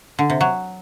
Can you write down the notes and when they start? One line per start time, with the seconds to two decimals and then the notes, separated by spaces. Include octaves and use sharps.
0.19 D3
0.30 C3
0.41 F#3